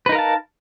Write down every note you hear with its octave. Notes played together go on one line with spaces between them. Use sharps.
D#4 A#4 B4 F5 A5